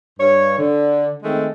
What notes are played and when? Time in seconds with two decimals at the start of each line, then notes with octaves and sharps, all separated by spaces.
0.18 G2 C#5
0.57 D3
1.23 D#3 G#3 A3 C4